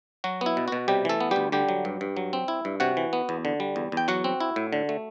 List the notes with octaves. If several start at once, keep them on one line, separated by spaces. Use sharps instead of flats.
F#3 F#4
B3 E4
B2
B2 F#4
C3 G3 G4
E3 A3 A4
B3
D2 G3 G4
D3 G3 G4
F#3
G2
G2
F#3
C4
E4
G2
C3 F#4 F#5
E3
B3
E2
D3
G3
E2
E2 G5
F#3 F#4 F#5
C4
E4
A2
D3
A3